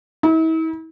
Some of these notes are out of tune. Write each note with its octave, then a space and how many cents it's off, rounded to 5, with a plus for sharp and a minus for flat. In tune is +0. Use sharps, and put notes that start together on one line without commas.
E4 -40